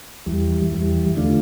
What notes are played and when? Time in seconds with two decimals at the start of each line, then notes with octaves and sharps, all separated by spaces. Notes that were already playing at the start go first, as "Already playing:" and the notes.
0.26 E2 E3 G3
0.71 E2 E3 G3
1.15 D3 A3 D4 F4